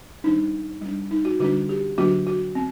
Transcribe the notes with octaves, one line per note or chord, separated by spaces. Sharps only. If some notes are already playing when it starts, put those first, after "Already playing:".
D#3 G3 D4 D#4
G3 D4
D#4
F#4
D3 G3 D4 F#4
G4
D3 F#3 A#3 D4 F#4
F#4
C4